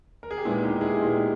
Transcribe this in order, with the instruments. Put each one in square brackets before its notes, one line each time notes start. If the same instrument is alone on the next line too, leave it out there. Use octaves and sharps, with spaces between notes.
[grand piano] A#4
G#4
G4
A#2 G#3 B3 D#4 E4
D#4 G4
E4 G#4
A#2 G#3 B3 D#4 G4